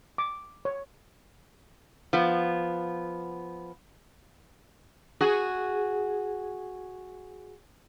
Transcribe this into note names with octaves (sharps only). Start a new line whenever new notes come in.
D6
C#5
F3 B3
F#4 G#4